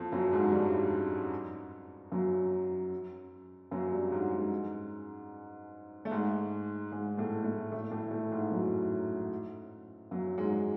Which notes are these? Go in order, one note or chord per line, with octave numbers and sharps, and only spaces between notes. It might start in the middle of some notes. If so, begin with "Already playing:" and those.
Already playing: F2 F3
F#2 F#3
G#2 G#3
G2 G3
F#2 F#3
F#2 F#3
G2 G3
G#2 G#3
G#2 G#3
A3
G#2 G#3
G#2 G#3
A2 A3
A2 A3
A2 A3
A2 A3
A2 A3
G#2 G#3
F#2 F#3
F#2 F#3
G#2 G#3